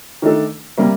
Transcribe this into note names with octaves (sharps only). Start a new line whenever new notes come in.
D#3 A3 D4 A4
C3 G3 A#3